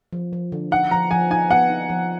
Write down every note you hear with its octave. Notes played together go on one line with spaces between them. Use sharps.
F3
F3
D3
D#4 F#5
F3 A#5
F3 G#5
D#4 G#5
B3 F#5
D#4
F3